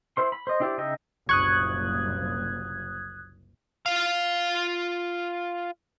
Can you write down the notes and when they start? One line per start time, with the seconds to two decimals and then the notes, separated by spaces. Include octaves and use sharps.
0.17 E4 C5 C6
0.32 B5
0.47 C5 D#5
0.60 D4 E4 G4 C5 D5
0.78 C#3 D#4 D#5 E5 G5
1.29 F#1 C2 A#2 C#6 D#6 F#6 G#6
3.86 F4 F5